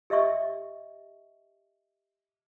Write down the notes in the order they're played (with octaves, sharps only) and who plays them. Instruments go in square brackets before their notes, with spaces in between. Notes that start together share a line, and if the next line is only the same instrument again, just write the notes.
[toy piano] G4 D#5 E5 C#6